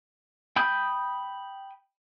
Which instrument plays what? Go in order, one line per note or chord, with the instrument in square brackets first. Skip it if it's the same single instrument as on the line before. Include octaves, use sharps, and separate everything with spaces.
[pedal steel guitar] G5 B5 D#6 G6